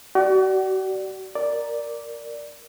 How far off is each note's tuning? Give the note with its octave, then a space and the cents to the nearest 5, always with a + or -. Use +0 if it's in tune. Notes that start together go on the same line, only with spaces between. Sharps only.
F#4 +40 D5 +0
A#4 +0 D5 +0